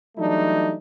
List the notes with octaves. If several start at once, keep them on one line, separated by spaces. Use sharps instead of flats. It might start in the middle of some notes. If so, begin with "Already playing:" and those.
E3 F#3 G3 A3 D4 D#4